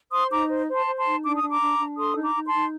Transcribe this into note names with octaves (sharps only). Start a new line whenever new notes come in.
C5 C6 D#6
D#4 A#5 D6
C5
C5
A5 C6
C5
A5 C6
D#4
D4 D6
D#6
D4
A#5 D6
D4
D4
A4 C6 D#6
D#4
A#5 D6
D#4
A5 C6
D#4